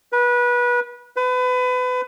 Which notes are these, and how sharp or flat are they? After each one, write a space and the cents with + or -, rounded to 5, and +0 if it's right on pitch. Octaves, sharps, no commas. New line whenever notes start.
B4 -25
B4 +30